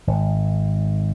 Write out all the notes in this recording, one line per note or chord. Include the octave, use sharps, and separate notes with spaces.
G#1